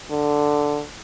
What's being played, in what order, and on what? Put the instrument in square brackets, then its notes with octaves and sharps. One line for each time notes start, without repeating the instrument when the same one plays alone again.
[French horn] D3